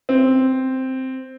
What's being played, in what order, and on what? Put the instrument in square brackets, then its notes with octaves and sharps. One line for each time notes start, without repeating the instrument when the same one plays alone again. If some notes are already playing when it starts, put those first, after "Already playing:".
[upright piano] C4